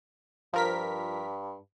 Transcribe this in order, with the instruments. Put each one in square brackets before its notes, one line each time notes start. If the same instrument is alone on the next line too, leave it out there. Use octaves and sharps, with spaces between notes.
[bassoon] G2 [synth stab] F3 A#4 B6